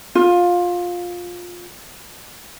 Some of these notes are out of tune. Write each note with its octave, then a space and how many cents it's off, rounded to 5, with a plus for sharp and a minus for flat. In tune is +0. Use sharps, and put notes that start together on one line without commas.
F4 +15